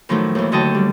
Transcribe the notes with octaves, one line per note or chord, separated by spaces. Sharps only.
A2 D#3 F3 F#3 A3
D#2 E3
D#2 D3 F#3 D#5 G5 A5
G3